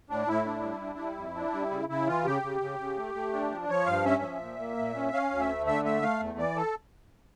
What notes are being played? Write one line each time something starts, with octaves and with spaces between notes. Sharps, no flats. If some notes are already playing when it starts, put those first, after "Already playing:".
A2 D4
A2 E4
D4
G3
D4
G3
F2
D4
G3
C#3
C#3 E4
E3 F4
C#3 G4
C#3
C#3
C#3
A3
A3
D4
F3
F3 C#5
G2 F5
C#4 E5
F3
A#2
A#3
A#2
C#4
C#4 F5
D2
E5
A3
D3 E5
A3 E5
A3 F5
E2
E3 D5
A4